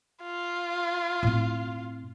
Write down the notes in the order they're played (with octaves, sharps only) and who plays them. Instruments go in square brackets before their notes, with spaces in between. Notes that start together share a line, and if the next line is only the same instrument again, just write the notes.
[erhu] F4
[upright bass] A2 C4